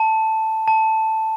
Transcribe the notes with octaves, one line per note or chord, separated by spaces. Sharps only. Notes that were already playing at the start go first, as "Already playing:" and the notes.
Already playing: A5
A5